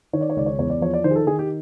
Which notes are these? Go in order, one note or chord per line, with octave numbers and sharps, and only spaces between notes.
D#3 C#5
D5
C#5
C#2 D5
C#5
E2 C#5
D5
F3 C#5
D5
D#3 C5
G#4
A4
D#3 G#4
G4